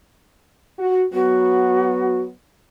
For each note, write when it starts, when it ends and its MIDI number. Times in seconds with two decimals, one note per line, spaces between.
0.79 1.04 66
1.13 2.31 54
1.13 2.31 59
1.13 2.20 66